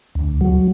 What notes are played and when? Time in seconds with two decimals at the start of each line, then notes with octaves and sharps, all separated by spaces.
0.15 D2
0.41 F#3